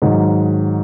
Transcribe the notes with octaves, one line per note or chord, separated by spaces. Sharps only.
G#2 D#3 F#3